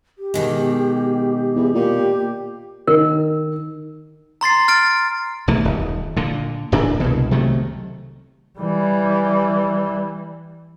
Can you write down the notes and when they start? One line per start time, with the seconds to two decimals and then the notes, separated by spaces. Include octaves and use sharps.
0.18 G4
0.34 B2 D#3 G#3
1.55 E2
1.74 A#2 G4
2.88 D#3 A#4
4.41 A#5 C6 A6 C7
4.68 F6 A6 D7
5.48 B1 E2 E3 A3
5.65 D#1
6.17 A#2 D3
6.72 D1 A#2 E3 D4
7.00 C2 B2
7.31 C3 D#3 F#3 A3
8.59 E3 G3